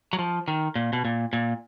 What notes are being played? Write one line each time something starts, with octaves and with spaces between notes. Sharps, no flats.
F#3
F3
D#3
A#2
B2
A#2
A#2